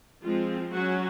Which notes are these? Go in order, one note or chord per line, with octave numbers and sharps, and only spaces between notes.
F3 G#3 C4 F4
F#3 C#4 F#4